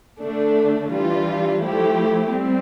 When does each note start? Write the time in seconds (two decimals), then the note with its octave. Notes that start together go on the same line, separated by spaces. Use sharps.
0.21 D3 A3 D4
0.91 E3 G3 D4 F4
1.60 F3 A3 E4 G4
2.30 G3 C4